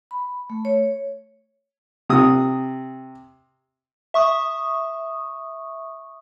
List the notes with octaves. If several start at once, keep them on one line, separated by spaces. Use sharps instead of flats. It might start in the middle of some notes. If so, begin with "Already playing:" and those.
B5
A3
C#5
C3 D#6
E5 C#6 D#6